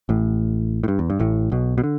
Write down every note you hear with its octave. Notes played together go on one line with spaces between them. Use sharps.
A1 A2
A2
G2
E2
G2
A1 A2
B1 B2
B2
D3